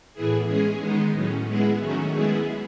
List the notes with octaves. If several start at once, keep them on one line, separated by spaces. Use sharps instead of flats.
A2 E3 B3 E4 G#4
G#3 C#4 G#4
D#3 G#3 B3 D#4
A2 F#3 C#4
G#3 B3 E4 G#4
D#3 F#3 A3 C#4 F#4
G#3 B3 E4 G#4